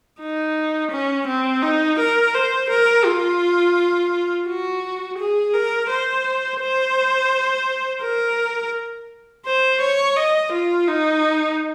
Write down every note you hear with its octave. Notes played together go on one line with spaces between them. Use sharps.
D#4
C#4
C4
D#4
A#4
C5
A#4
F4
F#4
G#4
A#4
C5
C5
A#4
C5
C#5
D#5
F4
D#4